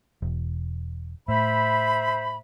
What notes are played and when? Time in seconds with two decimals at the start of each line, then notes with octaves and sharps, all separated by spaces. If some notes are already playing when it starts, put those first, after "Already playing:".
0.22 E1
1.28 A2 C5 E5 B5